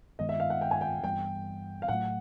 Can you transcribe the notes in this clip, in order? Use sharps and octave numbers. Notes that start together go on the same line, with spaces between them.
G2 D#3 G#3 B3 D#5
E5
F5
F#5
G5
G#5
G5
G2 E3 G3 B3 G5
F5
A2 F#3 A3 F#5